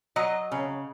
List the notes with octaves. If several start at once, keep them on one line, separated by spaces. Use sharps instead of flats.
F#3 D#5
C#3